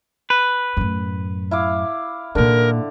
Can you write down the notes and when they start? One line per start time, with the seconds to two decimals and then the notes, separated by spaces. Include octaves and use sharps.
0.30 B4
0.77 F#2 A2
1.51 E4 F5 D6
2.35 A#2 D3 D#3 A#4